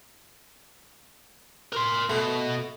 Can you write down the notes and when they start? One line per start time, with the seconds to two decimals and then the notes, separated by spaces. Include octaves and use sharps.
1.73 A#4 C6
2.10 B2 A3